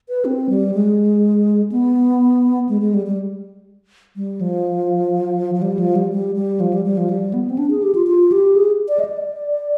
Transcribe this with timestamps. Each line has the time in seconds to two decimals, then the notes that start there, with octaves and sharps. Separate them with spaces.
0.09 B4
0.25 C4
0.49 G3
0.74 G#3
1.72 B3
2.69 G#3
2.81 G#3
2.94 G3
3.06 G3
4.16 G3
4.41 F3
5.55 F3
5.62 G3
5.79 F3
5.95 G3
6.12 G3
6.36 G3
6.60 F3
6.73 G3
6.85 G3
6.97 F3
7.09 G3
7.34 B3
7.50 C4
7.58 D4
7.70 G#4
7.83 G4
7.95 F4
8.07 F4
8.32 G4
8.56 G#4
8.89 D5
8.99 D#5
9.05 D5